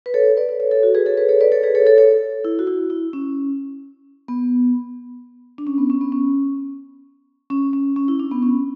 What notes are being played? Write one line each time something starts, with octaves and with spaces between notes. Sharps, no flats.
B4
A4 C#5
B4 D5
B4
A4 C#5
A4 C#5
F#4 A4
G#4 B4
A4 C#5
G#4 B4
A4 C#5
B4 D5
A4 C#5
G#4 B4
A4 C#5
A4 C#5
A4 C#5
E4
F#4
E4
E4
C#4
B3
D4
C#4
B3
C#4
B3
C#4
C#4
C#4
C#4
E4
D4
B3
C#4